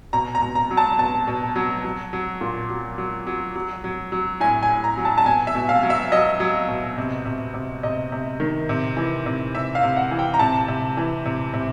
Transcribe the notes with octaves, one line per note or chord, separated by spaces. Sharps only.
B2 A#5
A#5
B2
A#5
F#3
A5
B2 A5
B2
F#3
F#3
F#3
A#2
F#3
F#3
F#3
F#3
F#3
F#3
A2 G#5
G#5
A2
A#5
F#3
A5
A5
B2 G#5
E5
B2
F5
F#3
E5
F#3 D#5
F#3
B2
C3
C3
C3
C3 D#5
C3
D#3
C3
E3
C3
C3 E5
F5
C3
F#5
E3
G5
A#5
C3 A5
C3
E3
C3
C3